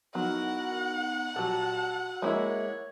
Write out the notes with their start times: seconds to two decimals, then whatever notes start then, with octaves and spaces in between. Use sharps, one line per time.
0.15 F#3 B3 D#4 E4 F#4 A#4 F#5
1.36 A#2 F#3 F#4 G4 A5 E6
2.22 G#3 A#3 E4 C#5